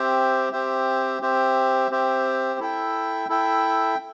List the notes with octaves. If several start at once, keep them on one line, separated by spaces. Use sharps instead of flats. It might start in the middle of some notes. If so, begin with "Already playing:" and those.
Already playing: C4 G4 C5 E5
C4 G4 C5 E5
C4 G4 C5 E5
C4 G4 C5 E5
E4 A4 E5 G5
E4 A4 E5 G5